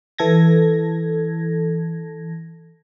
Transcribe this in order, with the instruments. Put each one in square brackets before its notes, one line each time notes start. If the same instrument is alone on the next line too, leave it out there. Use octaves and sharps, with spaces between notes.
[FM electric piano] E3 A4 G#6 A#6